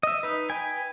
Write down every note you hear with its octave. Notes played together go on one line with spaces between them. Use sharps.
D#5 E5
D#4 B4
B4 G5 G#5